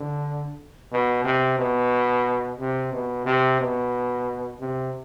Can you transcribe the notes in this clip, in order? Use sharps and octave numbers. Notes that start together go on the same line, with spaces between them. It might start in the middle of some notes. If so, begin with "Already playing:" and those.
Already playing: D3
B2
C3
B2
C3
B2
C3
B2
C3